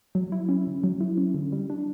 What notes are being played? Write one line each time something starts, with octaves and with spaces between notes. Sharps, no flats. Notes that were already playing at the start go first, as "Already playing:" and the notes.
F#3
E4
C#4
D3
F#3
E4
C#4
D3
G3
D4